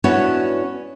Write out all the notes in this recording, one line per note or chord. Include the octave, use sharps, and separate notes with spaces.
B3 C#4 D4 E4 F#4 C#5